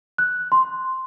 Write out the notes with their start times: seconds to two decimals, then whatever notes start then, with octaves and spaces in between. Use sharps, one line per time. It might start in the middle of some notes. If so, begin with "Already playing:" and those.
0.18 F#6
0.52 C6